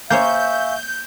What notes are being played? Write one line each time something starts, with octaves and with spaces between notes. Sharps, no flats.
A#3 C5 C#5 E5 F5 G#5 C#6 G6